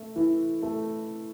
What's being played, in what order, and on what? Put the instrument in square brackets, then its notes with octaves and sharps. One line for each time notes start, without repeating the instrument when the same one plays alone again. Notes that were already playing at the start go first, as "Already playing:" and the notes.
Already playing: [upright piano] A3
E3
A3